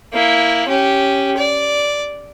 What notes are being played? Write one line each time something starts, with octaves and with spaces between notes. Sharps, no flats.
A#3 E4
C#4 G4
D5